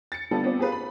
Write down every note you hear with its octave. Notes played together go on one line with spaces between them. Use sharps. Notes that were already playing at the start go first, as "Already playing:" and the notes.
A6 C#7
D3 G3 B3 F4 G4 A4
B3 C4 F4 D5
G4 G#4 A#4 B4 F5
B5